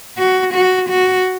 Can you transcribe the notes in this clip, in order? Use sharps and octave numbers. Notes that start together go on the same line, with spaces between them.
F#4
F#4
F#4